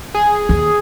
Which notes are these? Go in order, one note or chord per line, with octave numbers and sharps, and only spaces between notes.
G#4
D#2